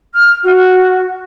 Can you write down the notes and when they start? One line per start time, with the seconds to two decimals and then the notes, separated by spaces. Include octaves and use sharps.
0.13 F6
0.43 F#4